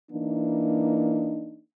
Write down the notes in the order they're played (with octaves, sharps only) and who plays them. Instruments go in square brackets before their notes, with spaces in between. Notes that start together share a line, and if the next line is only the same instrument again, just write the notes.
[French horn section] E3 A#3 D4 D#4